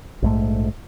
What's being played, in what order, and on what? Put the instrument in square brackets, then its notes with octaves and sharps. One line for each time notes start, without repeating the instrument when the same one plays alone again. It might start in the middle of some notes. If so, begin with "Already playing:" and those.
[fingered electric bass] A#1 G#2 A3